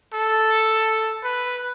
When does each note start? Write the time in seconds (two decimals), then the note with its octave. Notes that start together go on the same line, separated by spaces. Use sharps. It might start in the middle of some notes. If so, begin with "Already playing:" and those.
0.13 A4
1.24 B4